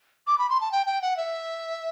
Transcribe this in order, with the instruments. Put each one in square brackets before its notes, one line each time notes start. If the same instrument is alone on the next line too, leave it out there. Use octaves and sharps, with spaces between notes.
[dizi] D6
B5
C6
A5
G5
G5
F#5
E5